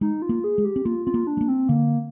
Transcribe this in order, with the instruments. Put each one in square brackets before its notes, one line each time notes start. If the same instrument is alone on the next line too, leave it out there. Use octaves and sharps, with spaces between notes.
[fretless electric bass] G#3 [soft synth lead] D#4
[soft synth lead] F4
[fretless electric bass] A#3
[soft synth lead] G#4
[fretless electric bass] G#3
[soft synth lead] G4
[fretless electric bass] C4
[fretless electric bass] A#3 [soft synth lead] F4
[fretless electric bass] C4 [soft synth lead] F4
[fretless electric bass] A#3
[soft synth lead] D4
[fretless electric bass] G#3
A#3
[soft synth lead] C4
[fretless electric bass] D3 [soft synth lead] A#3